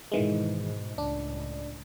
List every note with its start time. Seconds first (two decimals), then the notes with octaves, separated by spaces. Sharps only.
0.12 G#2 B2 D#3 E3 G#3
0.98 C#2 A2 D4